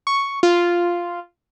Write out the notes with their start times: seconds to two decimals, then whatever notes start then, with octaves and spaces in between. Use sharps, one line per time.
0.07 C#6
0.43 F4